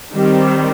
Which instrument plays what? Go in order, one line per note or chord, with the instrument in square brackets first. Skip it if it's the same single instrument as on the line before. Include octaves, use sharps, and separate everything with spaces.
[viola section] D#3 G3 C4